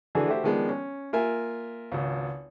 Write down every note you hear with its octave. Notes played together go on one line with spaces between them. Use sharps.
D3 E3 D4 F#4 G#4 A4
A3 F#4 G4 C5 E5
D#3 F3 G#3 B3 D4
C#4
A#3 F4 A#4 E5 G#5
G#1 C#2